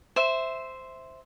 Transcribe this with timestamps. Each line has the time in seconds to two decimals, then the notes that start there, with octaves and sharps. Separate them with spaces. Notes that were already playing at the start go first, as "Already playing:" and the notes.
0.16 C5 E5